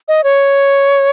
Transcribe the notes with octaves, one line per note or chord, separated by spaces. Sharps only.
D#5
C#5